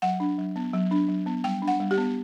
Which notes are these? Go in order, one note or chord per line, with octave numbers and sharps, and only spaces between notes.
F#3 F#5
D4
F#3
B3
F#3
D4
F#3
B3
G3 G5
D4
F#5
G3
G4
B3